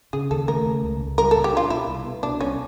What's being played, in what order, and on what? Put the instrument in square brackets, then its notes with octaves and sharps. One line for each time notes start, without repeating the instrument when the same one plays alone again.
[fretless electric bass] C#3 [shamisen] G#4
[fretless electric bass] D#2 [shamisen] A4
[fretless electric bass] A3 [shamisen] A#4
[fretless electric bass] C#3
C#2
C#2
[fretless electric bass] G3 [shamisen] A#4
[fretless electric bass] A#2 [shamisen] A4
[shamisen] G4
[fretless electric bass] D4 [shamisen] F4
[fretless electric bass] B2 [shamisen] E4
[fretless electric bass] C2
B3
[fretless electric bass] B2 [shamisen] D4
[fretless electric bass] C2 [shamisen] C#4